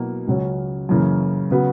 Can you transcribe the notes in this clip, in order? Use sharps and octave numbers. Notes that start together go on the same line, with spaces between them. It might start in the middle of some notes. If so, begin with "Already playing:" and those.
Already playing: B2 F#3 A#3 E4
C#2 C#3 F#3 C#4
F#2 C#3 E3 A#3
C#3 F#3 B3 F#4